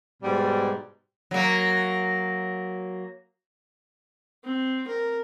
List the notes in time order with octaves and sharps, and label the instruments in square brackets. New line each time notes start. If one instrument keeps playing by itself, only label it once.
[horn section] G#2 B2 G3
[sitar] F#3 A#3
[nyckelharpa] C4
A#4